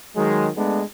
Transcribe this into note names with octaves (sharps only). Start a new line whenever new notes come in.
D#3 F#3 G#3
G#3 A3 B3 D4